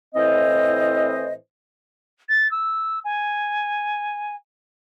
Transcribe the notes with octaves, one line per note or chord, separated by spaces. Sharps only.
A2 E3 C4 C5 D#5
A6
E6
G#5